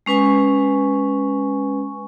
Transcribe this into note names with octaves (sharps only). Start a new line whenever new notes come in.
G#3 C#4 B4 G#5 C#6